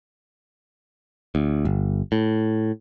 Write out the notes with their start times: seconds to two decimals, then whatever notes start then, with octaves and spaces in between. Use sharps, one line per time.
1.35 D2
1.65 G1
2.12 A2